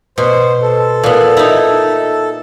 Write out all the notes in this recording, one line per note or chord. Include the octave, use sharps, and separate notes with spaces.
B2 C5
A4
A#2 B3
D#4 E4